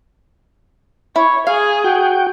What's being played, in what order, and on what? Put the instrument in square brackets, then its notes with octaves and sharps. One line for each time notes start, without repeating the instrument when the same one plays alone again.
[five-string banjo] E4 [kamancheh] C#5
[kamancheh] G#4 [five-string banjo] F5
[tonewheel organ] F#4 G5